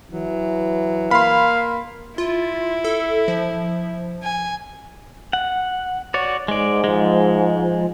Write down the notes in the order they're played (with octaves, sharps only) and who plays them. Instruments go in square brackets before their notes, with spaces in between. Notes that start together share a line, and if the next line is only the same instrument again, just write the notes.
[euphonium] E3 [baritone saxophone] F#3
[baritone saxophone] A#3 [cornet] F5 [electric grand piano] B5 C6
[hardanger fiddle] E4 [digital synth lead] F4
[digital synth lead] A4
F3
[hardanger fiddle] G#5
[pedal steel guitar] F#5
F#4 C#5 D5
[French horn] G#2 [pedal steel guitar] G#3 D5
[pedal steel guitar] F3 G#3